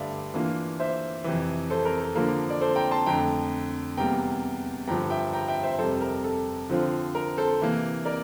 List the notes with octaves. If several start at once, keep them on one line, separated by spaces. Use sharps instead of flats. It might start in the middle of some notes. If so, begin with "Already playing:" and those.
Already playing: G2 D3 A3 D5 E5 F5
E3 A#3 D4 F4
C5 E5
F2 C3 E3
A4 C5
A#4
A4
D3 F3 A#3 A#4
D5
A4 C5
G5 A#5
A5 C6
F2 D3 A3 G5 A#5
E2 C3 G3 A#3 G5 A#5
G2 D3 F3 G5 A#5
E5 G5
G5 A#5
E5 G5
C5 E5
F2 C3 G3 A4 C5
A#4
A4
D3 F3 C4 F4
A#4
A4 C5
C3 E3 A#3
A#4 D5